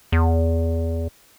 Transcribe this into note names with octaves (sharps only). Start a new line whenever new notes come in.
E2